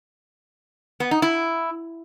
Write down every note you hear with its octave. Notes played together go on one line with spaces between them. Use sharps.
B3
D#4
E4